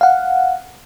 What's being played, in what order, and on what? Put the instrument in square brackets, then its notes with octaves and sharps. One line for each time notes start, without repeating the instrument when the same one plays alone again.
[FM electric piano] F5 F#5